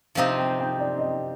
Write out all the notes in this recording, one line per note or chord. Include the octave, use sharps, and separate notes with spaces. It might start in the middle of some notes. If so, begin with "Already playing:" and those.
C3 F3 C4 D#4 F5
G5
G5
D5
D#5